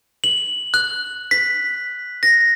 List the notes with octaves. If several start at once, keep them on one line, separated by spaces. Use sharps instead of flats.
F#7
F#6
B6
A#6